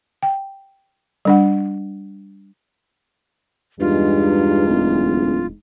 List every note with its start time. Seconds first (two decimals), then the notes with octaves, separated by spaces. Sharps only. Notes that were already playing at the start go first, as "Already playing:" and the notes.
0.23 G5
1.25 G3 D4 F#5
3.80 E2 G2 G#3 D#4 F4
4.68 D1